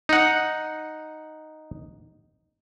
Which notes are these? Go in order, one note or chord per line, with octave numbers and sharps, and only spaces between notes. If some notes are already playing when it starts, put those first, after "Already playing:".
D#4 F#5